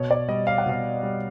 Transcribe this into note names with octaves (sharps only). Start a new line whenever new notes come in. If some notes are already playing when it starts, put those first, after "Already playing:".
Already playing: B2 C#5
D5
G3 D#5
F5
F#5
B2 F5
G3